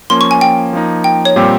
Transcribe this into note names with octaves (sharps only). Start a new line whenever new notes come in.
F3 A#3 C#4 C6
C#6
G#5
G5
F3 A#3 D#4
G5
C#5
A#2 G3 C4 G4